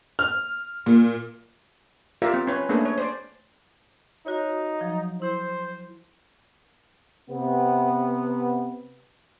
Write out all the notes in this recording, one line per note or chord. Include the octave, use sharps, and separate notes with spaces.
F6
A#2
F4 G4 A#4 D5 E5 F5
C4
C#4 B4 C#5
A3 A#3 C#4 D4 G#4 B4
C#5
C5 D5
D#4 F#4 C#5
F3 F#3
E4 C5
C3 B3